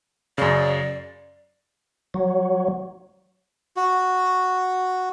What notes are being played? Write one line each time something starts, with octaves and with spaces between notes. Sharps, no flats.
F#2 C#3 D5
F#3
F#4